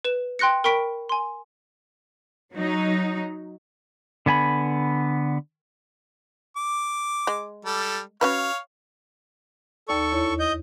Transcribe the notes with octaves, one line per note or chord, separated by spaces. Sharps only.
B4 E7
G5 C6 F#6 A#6 C#7
A#4 G5 B5 C#6 B6 D7
G#5 C6
F#3 D#4
D3 B3 G#5 B5
D6
G#3
G3 A4
C#4 F#4 B4 C#5 F5
D#2 D#4 A4 D5 C#6
E2 E4 C#5
D#5 G6